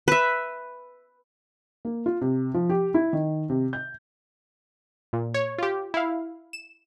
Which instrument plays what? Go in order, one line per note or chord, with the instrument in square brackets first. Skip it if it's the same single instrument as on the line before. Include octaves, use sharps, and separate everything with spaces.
[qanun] B4 E5
[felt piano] A#3
F4
C3
F3
G4
E4
D#3
C3
G6
[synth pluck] A#2
C#5
F4 G4
E4 F5
E7